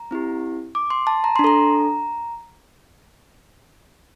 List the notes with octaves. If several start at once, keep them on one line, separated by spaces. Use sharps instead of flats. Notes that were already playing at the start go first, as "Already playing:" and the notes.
Already playing: A#5
C4 E4 G4
D6
C6
A5
A#5
D4 C6
A4 A#5